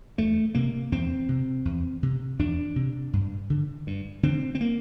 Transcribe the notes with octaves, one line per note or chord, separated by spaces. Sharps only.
E2 A3
C3 A#3
E2 C4
C3
E2
C3
E2 D4
C3
G2
D3
G2
D3 C4
C4
A#3